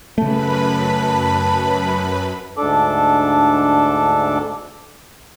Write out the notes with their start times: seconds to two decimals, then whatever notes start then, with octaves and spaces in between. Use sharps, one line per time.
0.18 F#2 C#3 A3 B4 A5 B5
2.57 D2 G#2 D4 A4 D6